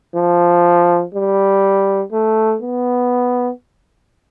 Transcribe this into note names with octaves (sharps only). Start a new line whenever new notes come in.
F3
G3
A3
B3